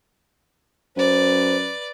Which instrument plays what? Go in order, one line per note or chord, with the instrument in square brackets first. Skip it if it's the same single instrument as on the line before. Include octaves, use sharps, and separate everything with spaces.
[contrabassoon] F#2 [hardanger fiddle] B4 D5 [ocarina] C5